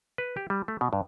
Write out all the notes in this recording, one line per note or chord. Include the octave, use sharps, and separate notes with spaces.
B4
G4
G3
A3
B2
G2